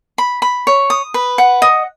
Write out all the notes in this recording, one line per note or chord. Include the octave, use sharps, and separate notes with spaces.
B5
B5
C#5
D#6
B4
F#5
D#5